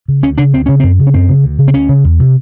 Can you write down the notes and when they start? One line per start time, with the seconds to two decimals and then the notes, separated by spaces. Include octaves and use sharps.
0.08 C#3
0.23 D2 C#4
0.38 C#3 D4
0.53 D2 C4
0.66 C#3 C#4
0.80 F#2 C4
0.99 C#3
1.07 C#4
1.14 F#2 C4
1.29 C#3
1.44 D2
1.58 C#3
1.68 C4
1.74 D2 C#4
1.89 C#3
2.04 E2
2.19 C3